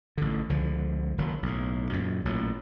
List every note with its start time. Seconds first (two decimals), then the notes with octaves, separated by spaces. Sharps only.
0.18 A1 D3
0.49 C#2 D3 F3
1.18 F#1 D#3 F#3
1.43 B1 A2
1.92 F#2 A#2 C#3
2.25 A1 A#2 F#3